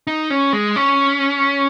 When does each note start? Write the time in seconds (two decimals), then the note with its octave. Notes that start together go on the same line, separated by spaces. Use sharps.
0.07 D#4
0.30 C#4
0.53 G#3
0.76 C#4